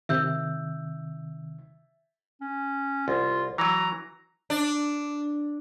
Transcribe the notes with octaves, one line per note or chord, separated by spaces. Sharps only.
C3 D#3 E5 E6 G6
C#4
C2 F4
E3 F#3 A#5
D4